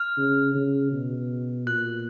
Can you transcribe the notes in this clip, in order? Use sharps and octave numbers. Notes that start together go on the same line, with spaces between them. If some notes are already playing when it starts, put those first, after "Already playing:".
Already playing: F6
C#3
C#3
B2
A#2 F#6